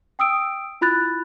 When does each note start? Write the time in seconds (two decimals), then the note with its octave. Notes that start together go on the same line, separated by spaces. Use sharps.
0.19 G5 D#6 E6 D7
0.81 E4 F4 B5 F#6 A6